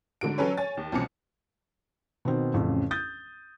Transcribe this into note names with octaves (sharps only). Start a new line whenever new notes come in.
G#2 D3 F#4 D7
F#3 C#4 A4 B4 C#5
C#5 G#5 A6
D#2
C2 B2 F3 C#4 D6 C#7
B2 D#3 C4
A1 F2 C#3
D#6 G6 A6